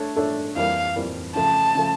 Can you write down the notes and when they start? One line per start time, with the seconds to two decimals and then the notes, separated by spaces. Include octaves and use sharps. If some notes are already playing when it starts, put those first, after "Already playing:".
Already playing: A3 D4 A4 C#5
0.16 A3 D4 A4 C#5 E5
0.56 F2 E3 G3 A#3 F5
0.96 F2 E3 G3 A#3
1.35 C#3 F3 A3 A5
1.75 C#3 F3 A3